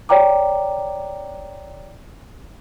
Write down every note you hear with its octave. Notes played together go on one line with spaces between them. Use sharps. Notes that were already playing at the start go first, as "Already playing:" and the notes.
C#5 D5 G5 A#5 D6